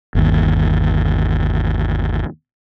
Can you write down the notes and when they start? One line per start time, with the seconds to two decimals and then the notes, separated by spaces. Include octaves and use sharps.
0.15 G1 D#2